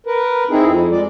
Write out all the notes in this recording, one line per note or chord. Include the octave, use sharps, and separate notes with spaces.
A#4 B4
C4 D#4 E4 G#4
F2
G#3 D5